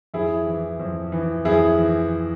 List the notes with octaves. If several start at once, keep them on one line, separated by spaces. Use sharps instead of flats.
F2 E4 G#4
E3
F2
E3
F2 E4 G#4
E3